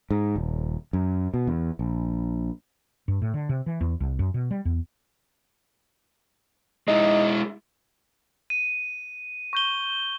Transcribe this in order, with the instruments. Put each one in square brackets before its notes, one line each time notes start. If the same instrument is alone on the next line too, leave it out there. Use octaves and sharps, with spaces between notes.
[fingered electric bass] G#2
D#1
F#2
B2
E2
A#1
[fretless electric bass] G2
A2
D3
C3
E3
E2
C2
F#2
B2
G3
E2
[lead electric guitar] G#3 E4 [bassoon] D#4
[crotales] D#7
C#6 G6 G7